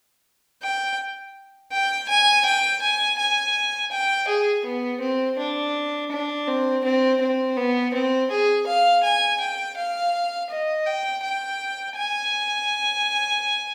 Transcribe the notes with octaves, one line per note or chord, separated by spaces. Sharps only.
G5
G5
G#5
G5
G#5
G#5
G5
G#4
B3
C4
D4
D4
C4
C4
C4
B3
C4
G#4
F5
G#5
G5
F5
D#5
G5
G5
G#5